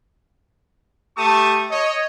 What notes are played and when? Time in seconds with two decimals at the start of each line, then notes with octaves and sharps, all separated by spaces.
1.18 A3 G4 A5 C#6 D#6
1.71 C#5 D#5